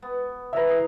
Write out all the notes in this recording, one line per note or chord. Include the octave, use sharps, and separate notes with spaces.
B3
E3 B4 E5 A#5
G#4